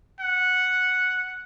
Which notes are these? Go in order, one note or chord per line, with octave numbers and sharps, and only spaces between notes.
F#5